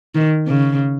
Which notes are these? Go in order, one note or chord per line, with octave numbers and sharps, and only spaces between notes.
D#3
C#3